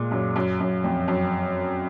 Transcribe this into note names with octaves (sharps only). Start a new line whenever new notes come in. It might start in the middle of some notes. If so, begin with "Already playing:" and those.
Already playing: A#2 G#3
F#2
F#2
F#2
F2
F#2